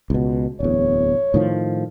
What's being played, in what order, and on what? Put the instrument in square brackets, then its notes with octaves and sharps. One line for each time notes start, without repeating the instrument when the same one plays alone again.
[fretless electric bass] C#2 B2
[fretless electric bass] D1 E2 [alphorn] C#5
[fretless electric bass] A2 D#3 F3